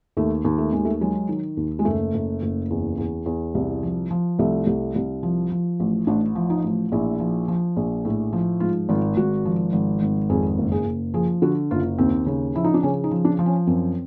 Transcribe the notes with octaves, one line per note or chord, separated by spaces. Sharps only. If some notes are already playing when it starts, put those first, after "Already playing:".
D#2 A3
D#2
A3
D#2 G#3
A3
F#3 G#3
D#3
D#2
G#3
F#1 A3
F#1
F#1
E2
E2
E2
C2
F3
F3
C2 A3
C2
C2
F3
F3
A1
A1 D4
F3
D#4
A1
A#1 E4
F3
F3
A#1
A2
F3
G#2 F4
G#1 F4
G#1 F#4
F3
G#1
G#1
F2 G#4
F#1
G#4
F#1
F3 G#4
D3 F#4
F#1 F4
D#2 C4
C#3
F3 E4
D#4
D4
C#3 C#4
D#4
F3
D4
F3
C#4
F#2 C4